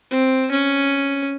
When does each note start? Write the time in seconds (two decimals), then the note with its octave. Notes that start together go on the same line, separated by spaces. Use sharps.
0.11 C4
0.51 C#4